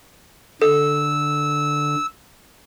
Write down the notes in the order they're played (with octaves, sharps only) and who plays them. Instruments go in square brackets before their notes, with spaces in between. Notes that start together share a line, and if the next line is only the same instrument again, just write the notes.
[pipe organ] D3 [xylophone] A4 [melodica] E6